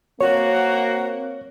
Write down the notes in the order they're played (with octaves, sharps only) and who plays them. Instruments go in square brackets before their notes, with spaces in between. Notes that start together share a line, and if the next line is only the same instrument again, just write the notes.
[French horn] A#3 [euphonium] C4 [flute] F#4 [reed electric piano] C#5